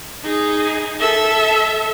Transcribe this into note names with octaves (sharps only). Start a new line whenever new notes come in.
D#4 G#4
A4 E5